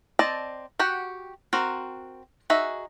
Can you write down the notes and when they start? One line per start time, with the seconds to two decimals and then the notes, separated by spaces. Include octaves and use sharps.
0.19 C4 D5 D#5 A5
0.79 F#4 G4 F#5 G5
1.53 C4 F#4 A#4
2.50 D#4 F#4 G#4 E5